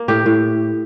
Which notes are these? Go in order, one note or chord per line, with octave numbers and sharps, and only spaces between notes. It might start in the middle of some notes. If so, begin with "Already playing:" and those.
Already playing: A#3
A2 G4
A2